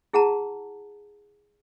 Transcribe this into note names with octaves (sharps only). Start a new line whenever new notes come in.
E4 G#4 F#5 A5 A#5